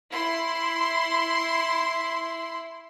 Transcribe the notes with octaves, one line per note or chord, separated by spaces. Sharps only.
E4 C6